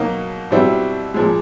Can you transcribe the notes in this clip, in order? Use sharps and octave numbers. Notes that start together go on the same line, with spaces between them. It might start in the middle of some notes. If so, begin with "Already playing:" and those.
Already playing: B2 F#3 A#3 D#4
B2 G3 C4 E4 G4
A#2 F3 G#3